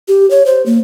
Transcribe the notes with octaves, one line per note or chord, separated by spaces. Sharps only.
G4
C#5
C5
A#3